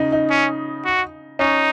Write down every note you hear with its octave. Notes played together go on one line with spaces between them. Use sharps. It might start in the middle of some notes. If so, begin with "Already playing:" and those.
Already playing: C#3 D#4
D#4
C#4
F#4
C#4 D#4